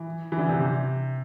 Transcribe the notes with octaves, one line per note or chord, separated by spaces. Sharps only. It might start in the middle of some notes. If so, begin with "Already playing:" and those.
Already playing: E3
E3
D3
C3
C3